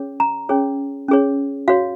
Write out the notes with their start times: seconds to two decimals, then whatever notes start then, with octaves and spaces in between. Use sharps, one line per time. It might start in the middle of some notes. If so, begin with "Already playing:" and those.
Already playing: C#4 G#4 C#5
0.20 A#5
0.49 C#4 G#4 C#5
1.08 C#4 G#4 C#5
1.68 F#4 C#5 F5